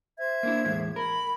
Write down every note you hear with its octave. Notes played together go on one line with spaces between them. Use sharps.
C5 E5 G#6
A#3 D4 E4
E2 A2 G#3
A#4 B5